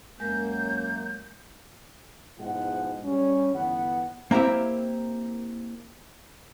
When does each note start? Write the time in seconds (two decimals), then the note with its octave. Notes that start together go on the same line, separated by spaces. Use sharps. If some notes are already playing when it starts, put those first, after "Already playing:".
0.20 F#2 G#3 A#3 A#4 G6
2.38 G#2 B2 F3 G#3 E4 F#5
3.04 G3 C#4
3.54 G1 E3 B3 F#5
4.31 A#3 C4 E4 G4 E5